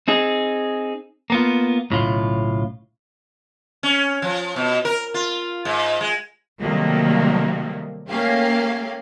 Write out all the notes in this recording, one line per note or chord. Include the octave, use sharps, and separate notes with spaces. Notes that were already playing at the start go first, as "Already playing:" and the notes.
C4 D#4 G#4
A#3 B3 F4
B1 A2 C#3 F4
C#4
F3
B2
A#4
F4
G#2
G#3
C3 D#3 F#3 G3 A3 A#3
A3 A#3 C#4 G4 F5